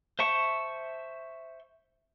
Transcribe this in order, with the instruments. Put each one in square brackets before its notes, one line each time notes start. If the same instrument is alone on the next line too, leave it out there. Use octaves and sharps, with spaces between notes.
[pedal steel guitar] C5 E5 A5 C#6